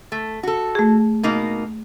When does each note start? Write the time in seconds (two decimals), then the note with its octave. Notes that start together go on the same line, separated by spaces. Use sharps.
0.12 A3
0.43 F#4 A4
0.75 A3 G#4
1.23 B2 A#3 D#4